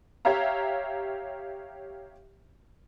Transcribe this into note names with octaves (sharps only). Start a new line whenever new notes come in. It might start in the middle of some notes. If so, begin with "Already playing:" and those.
G4 C#5 E5 F5 A#5